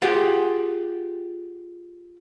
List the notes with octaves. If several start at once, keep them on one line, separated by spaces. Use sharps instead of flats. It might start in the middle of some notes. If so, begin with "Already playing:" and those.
F4 G4 G#4 F#5 G5